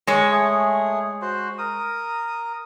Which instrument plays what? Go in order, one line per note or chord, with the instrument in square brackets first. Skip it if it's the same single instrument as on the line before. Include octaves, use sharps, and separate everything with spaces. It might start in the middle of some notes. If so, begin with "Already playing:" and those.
[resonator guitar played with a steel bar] G#3 C#5
[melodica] A3 G#4
F#4 C5
A#4 D#6